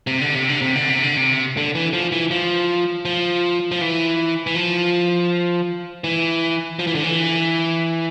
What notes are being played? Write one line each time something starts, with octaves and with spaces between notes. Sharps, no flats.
C3
D3
C3
D3
C3
D3
C3
D3
C3
D3
E3
F3
E3
F3
F3
F3
E3
E3
F3
E3
F3
E3
D3
E3